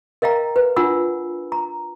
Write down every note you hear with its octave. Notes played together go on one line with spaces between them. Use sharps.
A#4 D#5 F5 G5 A#5
B4
D4 F4 F#5 G#5 B5 E6
A#5